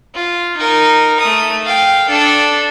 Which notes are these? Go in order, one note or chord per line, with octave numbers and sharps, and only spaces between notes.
F4
D#4 A#4
A3 D#6
F5 G5
D4 A4